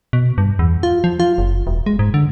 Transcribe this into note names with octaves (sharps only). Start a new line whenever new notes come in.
B2
G2
E2
F4
F3
F4
F#1
E1
G#3
G#2
D3